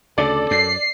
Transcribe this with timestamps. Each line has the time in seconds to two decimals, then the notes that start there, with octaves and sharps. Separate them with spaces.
0.18 D2 C#3 A4 D5
0.51 F#2 C7